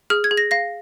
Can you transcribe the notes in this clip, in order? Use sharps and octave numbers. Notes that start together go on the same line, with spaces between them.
G#4 F6
G#6
G#4
A#6
F5 A#6